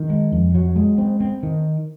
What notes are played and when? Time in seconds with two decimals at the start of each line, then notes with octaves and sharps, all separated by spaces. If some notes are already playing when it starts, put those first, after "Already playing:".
Already playing: D#3
0.10 G#3
0.32 F2
0.55 F#3
0.76 G#3
0.98 C4
1.20 C4
1.43 D#3